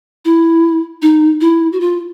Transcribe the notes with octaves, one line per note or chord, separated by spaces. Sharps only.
E4
D#4
E4
F#4
F4